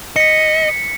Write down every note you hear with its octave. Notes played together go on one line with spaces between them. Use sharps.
D#5 B6 C#7